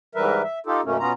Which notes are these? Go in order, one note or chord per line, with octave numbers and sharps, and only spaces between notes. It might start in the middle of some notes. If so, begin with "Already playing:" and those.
G#2 E3 G3 A#4 B4 E5
E5
D#4 F4 G4 A4
F#2 B2 A3 A#3 C#4
B2 B3 C#4 F4 A#5